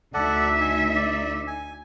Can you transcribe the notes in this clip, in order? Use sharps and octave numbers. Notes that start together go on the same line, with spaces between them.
D2 D#4 A4 D5 E5 F#5
G#5
D5
G#5